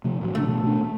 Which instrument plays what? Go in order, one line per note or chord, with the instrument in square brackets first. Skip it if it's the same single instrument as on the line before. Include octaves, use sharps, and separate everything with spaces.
[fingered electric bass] C3 F3 A3
A2 E3 F#3
[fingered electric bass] A1 C#3 D4 [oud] A3
[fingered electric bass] B2 E3
B2 D4
A3